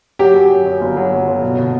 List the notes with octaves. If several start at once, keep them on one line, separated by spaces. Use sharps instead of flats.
F#3 G4
F#2
F#2
F#2
G1
F#3
G1
G1
B2
B2